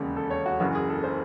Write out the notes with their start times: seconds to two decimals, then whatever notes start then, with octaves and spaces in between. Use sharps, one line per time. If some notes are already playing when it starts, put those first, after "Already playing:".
Already playing: E1 D#2 C#3
0.16 A4
0.31 C#5
0.46 F#4
0.60 F#1 F#2 C#3 E3 F#4
0.75 G#4
0.89 A4
1.04 C5